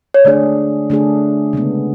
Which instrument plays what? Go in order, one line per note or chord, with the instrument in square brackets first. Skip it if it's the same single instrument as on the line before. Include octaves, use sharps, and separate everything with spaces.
[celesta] C#5
[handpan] D3 A3 D4 G#4 [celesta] D5
[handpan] D3 A3 D4 G#4
C#3 G#3 B3